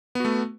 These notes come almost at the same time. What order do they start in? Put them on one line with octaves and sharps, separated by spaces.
B3 F#4 A3